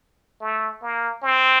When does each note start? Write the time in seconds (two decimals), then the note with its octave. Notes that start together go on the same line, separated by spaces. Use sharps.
0.41 A3
0.82 A#3
1.23 C4